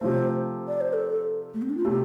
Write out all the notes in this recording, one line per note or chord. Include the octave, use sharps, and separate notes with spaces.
C3 F3 A3 C5
D5
C5
A4
A3
C4
D4
F4
C3 A3 G4